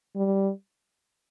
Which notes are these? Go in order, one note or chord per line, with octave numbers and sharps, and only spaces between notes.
G3